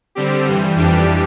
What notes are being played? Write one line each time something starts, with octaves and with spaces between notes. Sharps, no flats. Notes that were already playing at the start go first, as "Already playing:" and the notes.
D3 G3 C4 G4
G2 E3 G3
F2 E3 G3 D4 G4